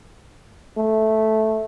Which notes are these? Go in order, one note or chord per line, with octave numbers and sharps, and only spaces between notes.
A3